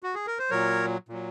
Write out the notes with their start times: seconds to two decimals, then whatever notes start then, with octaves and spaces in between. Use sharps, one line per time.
0.03 F#4
0.15 G#4
0.27 A#4
0.39 C5
0.50 A#2 F#3 A#4 C#5
1.09 A#2 F#3